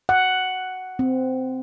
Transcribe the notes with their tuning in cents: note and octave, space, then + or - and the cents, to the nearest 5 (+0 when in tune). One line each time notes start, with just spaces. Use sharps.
F#5 +5
C4 -15